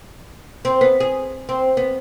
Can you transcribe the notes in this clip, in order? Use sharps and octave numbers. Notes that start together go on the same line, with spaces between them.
C4
B3
G#4
C4
B3